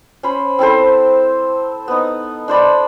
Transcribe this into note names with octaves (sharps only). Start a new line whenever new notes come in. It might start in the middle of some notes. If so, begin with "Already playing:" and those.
C#4 C5 B5
C4 E4 A4 C5
B3 D#4
D4 C5 D5 B5